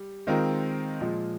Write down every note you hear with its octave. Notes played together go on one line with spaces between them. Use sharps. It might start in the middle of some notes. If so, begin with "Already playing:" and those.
Already playing: G3
D#3 G#3 C4 F4 A#4
A#2 F3 G#3